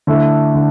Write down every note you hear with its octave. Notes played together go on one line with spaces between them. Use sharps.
D3 A3 E4
D3